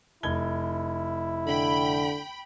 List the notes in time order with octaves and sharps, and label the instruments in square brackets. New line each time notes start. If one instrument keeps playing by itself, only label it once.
[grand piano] F1 G#6 G7 [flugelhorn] E4
[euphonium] D3 [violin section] G5 B5